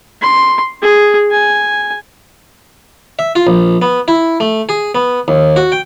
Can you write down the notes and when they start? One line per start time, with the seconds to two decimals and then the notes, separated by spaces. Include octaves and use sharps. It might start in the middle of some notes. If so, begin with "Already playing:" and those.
0.22 C6
0.82 G#4
1.31 G#5
3.19 E5
3.36 F4
3.47 A#1
3.82 B3
4.08 E4
4.40 A3
4.69 G#4
4.95 B3
5.28 D#2
5.56 F#4
5.72 G5